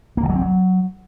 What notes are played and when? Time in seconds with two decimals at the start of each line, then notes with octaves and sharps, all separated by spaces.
0.17 A#3
0.23 D3
0.29 F#3
0.35 C4
0.42 F#3